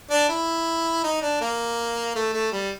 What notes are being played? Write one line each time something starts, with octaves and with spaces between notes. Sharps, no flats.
D4
E4
D#4
D4
A#3
A3
A3
G3